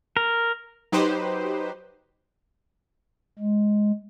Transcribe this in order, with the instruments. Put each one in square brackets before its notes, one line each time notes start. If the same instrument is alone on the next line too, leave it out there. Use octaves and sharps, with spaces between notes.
[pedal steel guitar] A#4
[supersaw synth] F#3 D#4 G4 B4 C5
[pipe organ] G#3